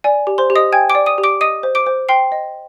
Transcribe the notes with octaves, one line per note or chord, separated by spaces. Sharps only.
D5 G#5
G4
C5 C6
G4
D#5 D#6
G5 G#5 G#6
D6 D7
D5
D#6 D#7
G4
D6 D7
D#5 D#6 D#7
C5
D6 D7
C5
G5 C6 C7
D#5